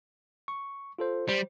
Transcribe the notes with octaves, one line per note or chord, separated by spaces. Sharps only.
C#6
F4 A4 C5
G3 C5